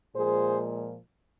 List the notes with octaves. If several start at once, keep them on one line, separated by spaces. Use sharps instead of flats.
A#2 F3 G#3 G#4 C5